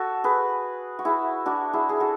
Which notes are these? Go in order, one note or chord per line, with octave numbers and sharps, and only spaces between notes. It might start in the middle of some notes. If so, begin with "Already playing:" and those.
Already playing: F#4 A4
G#4 B4
F#4
E4 G#4
D4 F#4
E4 G#4
G#4
F#4 A4